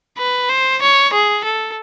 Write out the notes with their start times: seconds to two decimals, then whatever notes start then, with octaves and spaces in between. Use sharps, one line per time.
0.18 B4
0.49 C5
0.82 C#5
1.13 G#4
1.45 A4